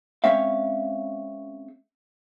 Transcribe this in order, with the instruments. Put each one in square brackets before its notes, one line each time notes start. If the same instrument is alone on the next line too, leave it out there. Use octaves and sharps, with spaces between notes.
[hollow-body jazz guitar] G#3 C4 C#4 C#5 E5 F5